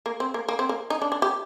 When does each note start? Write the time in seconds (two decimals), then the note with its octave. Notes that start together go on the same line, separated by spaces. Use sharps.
0.06 A#3
0.20 C4
0.34 A#3
0.49 A#3
0.59 C4
0.69 A#3
0.90 D#4
1.02 D4
1.12 D4
1.22 G4